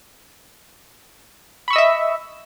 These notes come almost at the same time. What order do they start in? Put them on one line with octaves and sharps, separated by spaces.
B5 C#6 E6 D#5 E5